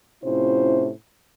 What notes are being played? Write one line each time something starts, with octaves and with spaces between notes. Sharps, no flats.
A2 C3 C#4 E4 F4 C5